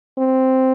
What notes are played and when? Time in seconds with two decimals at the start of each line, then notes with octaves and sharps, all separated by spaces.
0.18 C4